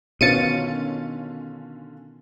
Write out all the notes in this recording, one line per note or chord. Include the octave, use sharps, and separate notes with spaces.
B2 D3 D#3 C#4 F4 A6 C#7 D#7